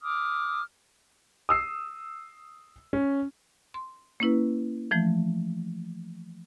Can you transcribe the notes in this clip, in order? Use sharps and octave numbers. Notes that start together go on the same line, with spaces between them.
D6 D#6 F6
D#6 E6 C7
C#4
C6
A#3 C#4 E4 B4
E3 F3 A3